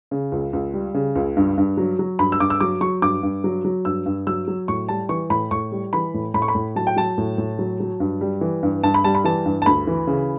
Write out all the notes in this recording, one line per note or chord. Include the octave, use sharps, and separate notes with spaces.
C#3
C#2
C#2
G3
C#3
C#2
G2
G2
F#3
F#3
G2 B5
E6
G2 D6
E6
F#3 D6
F#3 C#6
G2 D6
G2
F#3
F#3
G2 E6
G2
F#3 E6
F#3
A2 C#6
G3 A5
E3 C#6
A2 B5
A2 C#6
G3
E3 B5
A2
A2 B5
C#6
B5
A2
F#3 A5
G5
F#3 A5
A2
A2
F#3
F#3
G2
G3
E3
G2
G2 A5
B5
G3 A5
B5
E3 A5
G2
A5
D2 B5
E3
C#3